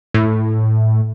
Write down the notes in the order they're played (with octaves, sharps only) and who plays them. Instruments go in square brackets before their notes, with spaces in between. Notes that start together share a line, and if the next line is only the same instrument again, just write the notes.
[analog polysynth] A2